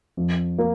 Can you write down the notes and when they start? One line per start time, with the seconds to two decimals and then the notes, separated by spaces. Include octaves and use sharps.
0.17 F2
0.59 A#3